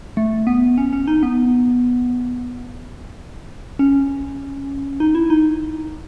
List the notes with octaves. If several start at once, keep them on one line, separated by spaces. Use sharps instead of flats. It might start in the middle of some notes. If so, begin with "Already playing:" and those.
A3
B3
C#4
C#4
D#4
B3
C#4
D#4
E4
D#4